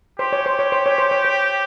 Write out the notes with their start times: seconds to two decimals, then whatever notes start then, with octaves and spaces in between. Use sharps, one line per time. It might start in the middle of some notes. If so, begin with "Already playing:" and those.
0.19 G4 C5
0.33 C#5
0.46 C5
0.59 C#5
0.72 C5
0.86 C#5
0.98 C5
1.11 C#5
1.25 C5